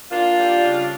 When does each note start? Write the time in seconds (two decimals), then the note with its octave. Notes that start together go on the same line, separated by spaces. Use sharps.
0.11 A#3 D4 F4
0.38 G3
0.63 C#3